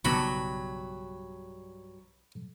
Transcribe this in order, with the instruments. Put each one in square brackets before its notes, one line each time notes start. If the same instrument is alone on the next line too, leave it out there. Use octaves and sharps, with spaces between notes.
[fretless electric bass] B1 C#3 B3 [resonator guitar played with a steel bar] G2 F#3 [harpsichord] B5